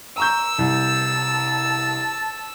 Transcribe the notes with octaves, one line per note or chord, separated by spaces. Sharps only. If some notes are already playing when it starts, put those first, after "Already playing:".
A#5 C#6 E6 G6
C2 A5